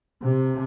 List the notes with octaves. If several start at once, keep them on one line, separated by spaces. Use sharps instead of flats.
C3